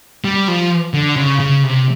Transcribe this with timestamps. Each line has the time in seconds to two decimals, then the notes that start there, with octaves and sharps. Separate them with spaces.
0.24 G3
0.48 F3
0.94 D3
1.16 C#3
1.40 C#3
1.64 C3